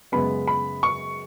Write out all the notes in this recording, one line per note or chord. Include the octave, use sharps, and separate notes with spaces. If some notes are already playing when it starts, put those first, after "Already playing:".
F#2 C#3 G#3 B3 B5
B5
C#6